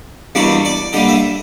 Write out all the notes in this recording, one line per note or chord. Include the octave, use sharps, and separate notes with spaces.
E2 B2 G3 A#3 D4 C#5
D5
D3 G3 A#3 D#5
E5